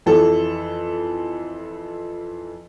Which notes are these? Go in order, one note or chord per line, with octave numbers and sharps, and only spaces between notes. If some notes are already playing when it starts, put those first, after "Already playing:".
F2 E3 A4